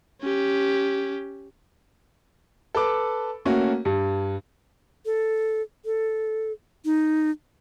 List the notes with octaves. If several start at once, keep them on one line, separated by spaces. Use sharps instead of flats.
C#4 G4
A4 B4 D6
A3 A#3 C#4 F#4
G2
A4
A4
D#4